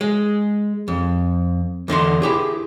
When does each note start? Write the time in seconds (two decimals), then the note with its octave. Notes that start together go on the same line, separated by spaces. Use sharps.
0.01 G#3
0.88 F2
1.88 E2 D3 D#5 C6
2.22 E4 G4 G#4